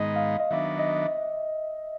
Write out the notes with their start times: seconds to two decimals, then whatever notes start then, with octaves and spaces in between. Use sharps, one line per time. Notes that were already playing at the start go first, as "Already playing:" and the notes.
Already playing: G#2 D#3 G#3 B3 D#4 D#5
0.16 F5
0.40 D#5
0.51 D#3 F#3 B3 D4 E5
0.79 D#5